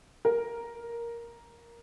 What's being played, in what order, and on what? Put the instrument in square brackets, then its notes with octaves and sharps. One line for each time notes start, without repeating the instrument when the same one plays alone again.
[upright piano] A#4